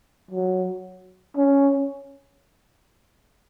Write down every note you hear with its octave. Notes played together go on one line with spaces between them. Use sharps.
F#3
C#4